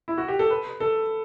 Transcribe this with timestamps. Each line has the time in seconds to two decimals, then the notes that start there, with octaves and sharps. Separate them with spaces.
0.08 E4
0.18 F#4
0.28 G4
0.39 A4
0.50 B4
0.80 A4